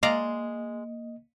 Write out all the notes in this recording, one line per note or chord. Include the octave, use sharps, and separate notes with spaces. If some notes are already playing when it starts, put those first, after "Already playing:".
G#3 A#3 D5 D#5 F5 A#5